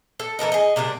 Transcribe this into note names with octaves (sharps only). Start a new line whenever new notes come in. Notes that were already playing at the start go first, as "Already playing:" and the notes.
A4
E3 A4 A#4 D#5
G#4 D#5
C3 G3 A#3 D4